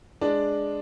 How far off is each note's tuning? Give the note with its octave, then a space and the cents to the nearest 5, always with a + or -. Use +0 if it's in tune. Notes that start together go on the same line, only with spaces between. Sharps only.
G#3 +0 D4 +0 D5 +0